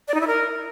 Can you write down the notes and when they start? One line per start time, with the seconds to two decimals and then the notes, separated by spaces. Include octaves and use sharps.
0.08 D5
0.14 D#4
0.21 E4
0.27 A#4